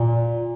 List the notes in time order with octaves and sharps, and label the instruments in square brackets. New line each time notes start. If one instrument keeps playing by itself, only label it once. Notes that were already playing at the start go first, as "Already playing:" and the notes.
Already playing: [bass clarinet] A#2